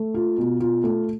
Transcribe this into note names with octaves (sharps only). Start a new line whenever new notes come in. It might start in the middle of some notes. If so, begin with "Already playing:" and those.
Already playing: A3
F4
B2
F4
A3